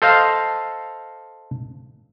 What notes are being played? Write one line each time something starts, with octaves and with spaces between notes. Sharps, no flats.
A4 C5 D#5 F5